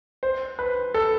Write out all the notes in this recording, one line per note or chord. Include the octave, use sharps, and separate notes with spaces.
C5
B4
A4